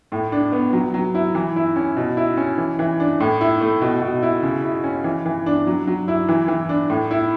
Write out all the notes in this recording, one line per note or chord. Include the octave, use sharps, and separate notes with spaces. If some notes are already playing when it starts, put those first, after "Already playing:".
A2
D4
B3
F#3
F#3
E4
E3
E4
C#4
B2
E4
C#4
E3
E3
D4
A2
E4
A3
B2
B2
E4
C#3
E4
C#4
E3
E3
D4
F#3
F#3
E4
E3
E3
D4
A2
E4